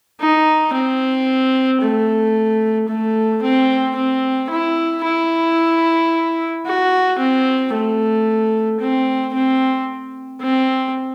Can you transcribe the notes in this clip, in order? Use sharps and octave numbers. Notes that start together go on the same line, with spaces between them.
D#4
C4
A3
A3
C4
C4
E4
E4
F#4
C4
A3
C4
C4
C4